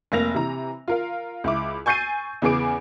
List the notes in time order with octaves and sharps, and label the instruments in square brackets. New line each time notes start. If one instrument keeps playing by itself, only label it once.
[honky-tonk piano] F1 A#3 A#6 F7
C3 E3 A#5
F4 A#4 F5
C#2 E4 D6
G#5 C#6 G6 A6 C7 D#7
E2 C#3 B3 G#4 D6 D7